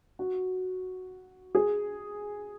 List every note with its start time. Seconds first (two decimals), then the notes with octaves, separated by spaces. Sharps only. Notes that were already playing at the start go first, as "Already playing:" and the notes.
0.19 F#4
1.55 G#4